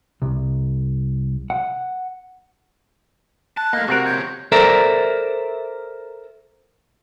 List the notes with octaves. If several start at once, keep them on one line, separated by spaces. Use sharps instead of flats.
C2
F#5
A5 F#6
A3 A#3 D#5
C3 C4 F#4 A#4
F2 C#5 G6
A4 A#4 C5 D5 E5 A#5